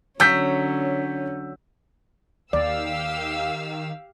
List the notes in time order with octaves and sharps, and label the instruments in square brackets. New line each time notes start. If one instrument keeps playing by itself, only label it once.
[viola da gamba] D3 C#4 [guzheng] F#3 [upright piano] E6 G6 B6
[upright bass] D#2 [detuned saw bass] D#3 [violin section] G4 F5 E6 [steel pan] D5